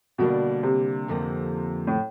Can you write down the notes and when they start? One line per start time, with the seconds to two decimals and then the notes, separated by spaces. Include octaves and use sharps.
0.18 B2 D3 G3 A#3 D4
0.63 C3
1.08 F2 D3 F3 A#3
1.87 A2